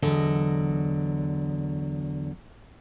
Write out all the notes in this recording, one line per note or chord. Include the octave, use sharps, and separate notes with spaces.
E2 D3 F#3 D#5